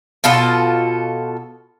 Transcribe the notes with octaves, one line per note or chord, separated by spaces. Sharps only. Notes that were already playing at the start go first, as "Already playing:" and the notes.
B2 F4 A4 D#5